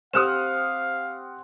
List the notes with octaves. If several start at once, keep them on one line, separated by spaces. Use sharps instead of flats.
C4 G4 C5 F5 F#5 D#6 F6 E7